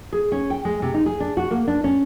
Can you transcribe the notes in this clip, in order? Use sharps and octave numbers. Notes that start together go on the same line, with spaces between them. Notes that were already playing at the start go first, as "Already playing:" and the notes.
G#4
C#4
G5
G#3
C3
D#4
G#4
D4
F#4
A#3
D4
C#4